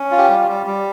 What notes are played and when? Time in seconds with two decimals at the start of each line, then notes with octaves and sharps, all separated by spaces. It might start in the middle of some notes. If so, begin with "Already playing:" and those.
Already playing: C#4
0.11 F4
0.18 G4
0.29 G3
0.48 G3
0.66 G3